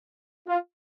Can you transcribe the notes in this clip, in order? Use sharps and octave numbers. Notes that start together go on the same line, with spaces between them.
F4